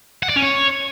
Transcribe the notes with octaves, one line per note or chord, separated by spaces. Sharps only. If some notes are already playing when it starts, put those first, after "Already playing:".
F#5
D5
C#4
C#5